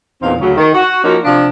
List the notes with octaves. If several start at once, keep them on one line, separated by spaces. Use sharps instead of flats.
E2 A#2 C4 D#4 F5
D2 C#3 F#3
D#3
F#4
F3 A#3 C#4 D#4 F#4
C3 F3 D4